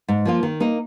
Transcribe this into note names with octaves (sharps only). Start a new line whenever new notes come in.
G#2
F3 A#3 F4
D#3
A#3 D#4